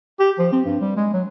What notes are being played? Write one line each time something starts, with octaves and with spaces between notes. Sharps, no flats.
G4
F3
C4
G2
G3
G#3
F#3